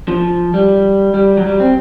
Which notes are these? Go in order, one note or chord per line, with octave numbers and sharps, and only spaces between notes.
F3
G3
G3
F#3
G3
C4